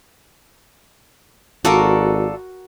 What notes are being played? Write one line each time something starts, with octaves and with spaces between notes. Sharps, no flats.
G#1 F4 F#4 A4 A#4 D5